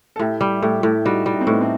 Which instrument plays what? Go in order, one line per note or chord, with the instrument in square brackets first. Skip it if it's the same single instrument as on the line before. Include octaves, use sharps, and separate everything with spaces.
[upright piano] A4
[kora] A2 [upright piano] E4 G4
[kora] G3
[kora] A2 [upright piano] E4 G4
[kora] A2
[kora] G3 [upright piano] D#4 F#4
[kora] G3
[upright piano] D#4
C4
[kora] A2 [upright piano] B3 D#4
[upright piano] A3 C4